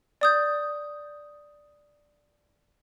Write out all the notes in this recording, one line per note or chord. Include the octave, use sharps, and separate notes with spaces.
D5 D#6 G6